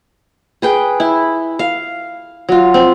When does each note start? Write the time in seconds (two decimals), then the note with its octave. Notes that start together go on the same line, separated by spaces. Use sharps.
0.62 G#4 B4 G5
1.00 E4
1.59 F5
2.49 F#3 F4
2.74 C4